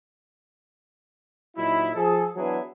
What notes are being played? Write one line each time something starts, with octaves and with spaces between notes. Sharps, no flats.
A#2 F#3 D#4 E4
F3 G#4 A4
E3 F#3 B3 D4 E4 G#4